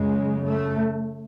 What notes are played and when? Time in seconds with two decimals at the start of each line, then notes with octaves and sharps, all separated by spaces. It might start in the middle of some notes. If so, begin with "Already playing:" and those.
Already playing: F#2 C#3 G#3
0.44 A3